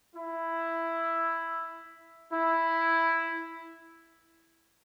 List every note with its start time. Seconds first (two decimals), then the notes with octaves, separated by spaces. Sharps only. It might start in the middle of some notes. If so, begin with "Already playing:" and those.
0.16 E4
2.31 E4